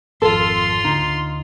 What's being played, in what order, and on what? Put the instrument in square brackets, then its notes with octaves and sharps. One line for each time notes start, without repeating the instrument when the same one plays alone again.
[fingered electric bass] G#1 F2 [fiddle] F4 C6 [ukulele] A4
[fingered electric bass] D2 D3 [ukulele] D#4